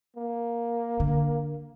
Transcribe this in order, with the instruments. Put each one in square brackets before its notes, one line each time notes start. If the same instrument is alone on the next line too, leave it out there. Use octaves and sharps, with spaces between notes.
[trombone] A#3
[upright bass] D3